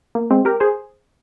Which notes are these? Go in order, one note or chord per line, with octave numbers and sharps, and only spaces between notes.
A#3
G#3 C4
G4 A#4
G#4 C5